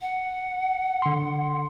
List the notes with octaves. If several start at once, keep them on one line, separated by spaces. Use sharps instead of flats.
F#5
D3 C6